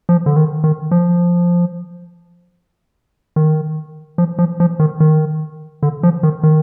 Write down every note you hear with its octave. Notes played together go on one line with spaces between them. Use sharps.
F3
D3
D#3
D#3
F3
D#3
F3
F3
F3
D#3
D#3
D3
F3
D#3
D#3